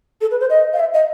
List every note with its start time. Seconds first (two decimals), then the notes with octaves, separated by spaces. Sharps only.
0.21 A4
0.31 B4
0.40 C5
0.50 D#5
0.73 F5
0.80 E5
0.94 D#5